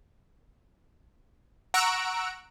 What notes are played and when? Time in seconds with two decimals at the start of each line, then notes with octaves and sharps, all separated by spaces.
1.74 F#5 A#5 C#6 E6 F#6 D7